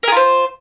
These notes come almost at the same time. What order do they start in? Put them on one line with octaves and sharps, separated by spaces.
A#4 G#4 F4 C5